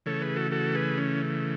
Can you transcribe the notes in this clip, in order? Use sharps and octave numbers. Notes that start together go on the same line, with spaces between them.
C#3 E3 A3 A4 C#5
G#4 B4
F#4 A4
F#4 A4
G#4 B4
C#4